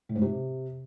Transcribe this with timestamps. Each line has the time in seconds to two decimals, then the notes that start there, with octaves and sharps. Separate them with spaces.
0.09 A2
0.15 G#2
0.22 C3